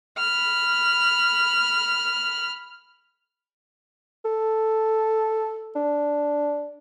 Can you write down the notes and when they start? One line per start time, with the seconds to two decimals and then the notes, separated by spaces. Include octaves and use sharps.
0.18 B5 F6
4.25 A4
5.76 D4